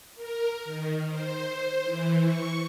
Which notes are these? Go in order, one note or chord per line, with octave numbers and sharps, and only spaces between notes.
A#4
D#3
C5
E3
C#6